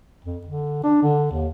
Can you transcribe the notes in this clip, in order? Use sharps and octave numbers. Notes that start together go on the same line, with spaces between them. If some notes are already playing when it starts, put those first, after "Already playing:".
F2
D3
D4
D3
D#2